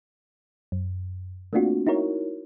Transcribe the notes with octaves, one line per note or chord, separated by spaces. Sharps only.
F#2
A3 A#3 C4 D4 F4 F#4
D#4 E4 F#4 A#4 C#5